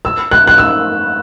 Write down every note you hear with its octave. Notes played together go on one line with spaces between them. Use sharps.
E6
F#6
F#6
E6